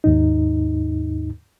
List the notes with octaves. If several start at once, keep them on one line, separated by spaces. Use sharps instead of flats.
D#2 G#2 D#4